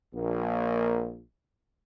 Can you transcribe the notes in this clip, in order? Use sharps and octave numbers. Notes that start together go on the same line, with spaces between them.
A#1 A#3